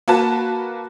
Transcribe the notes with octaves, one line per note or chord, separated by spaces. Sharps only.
A#3 F#4 B4 A5